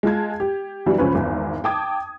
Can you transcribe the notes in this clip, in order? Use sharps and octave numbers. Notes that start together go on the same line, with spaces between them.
G#3 F4 A5 G#6
G4
E3 F#3 G3 D4
C#2 F3 C#4 B4
G#1 E2
G5 A5 D6 D#6 G#6